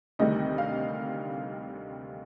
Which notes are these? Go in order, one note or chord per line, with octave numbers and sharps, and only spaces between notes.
D2 C3 D#3 G3 D#5
F5